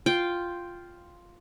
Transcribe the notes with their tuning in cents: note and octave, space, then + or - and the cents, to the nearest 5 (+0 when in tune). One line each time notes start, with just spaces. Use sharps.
F4 +0 G5 +0